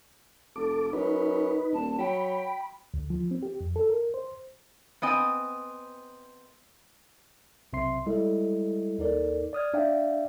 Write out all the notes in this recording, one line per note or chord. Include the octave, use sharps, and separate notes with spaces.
F1 A4 D6
F#2 D#4 B4
D#1 A5
F#3 G5 B5
D2
F3
C4
G4
F2
A4
A#4
C5
B3 C4 D#5 G#5
B1 C3 C4 E5 C6 C7
G3 G#3 E4 A4 D#5
D#2 D#4 A4 A#4 D5
D5 D#6 F6 G#6
D4 D5 E5 F5 G5